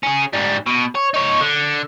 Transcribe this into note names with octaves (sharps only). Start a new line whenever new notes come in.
C#4 G#4
G#2 G3
B2
C#5
D#4 C#5
D3